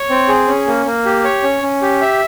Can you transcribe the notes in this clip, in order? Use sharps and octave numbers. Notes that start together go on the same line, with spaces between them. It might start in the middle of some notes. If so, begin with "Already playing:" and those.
Already playing: C#5
C4
G#4
C#4
A#3
A#3
G4
C#5
C#4
C#4
G4
E5